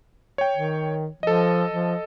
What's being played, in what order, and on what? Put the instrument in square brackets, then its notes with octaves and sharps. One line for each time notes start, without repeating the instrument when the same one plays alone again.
[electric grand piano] C#5 G5
[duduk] D#3
[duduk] F3 [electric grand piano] A4 D#5
[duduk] F3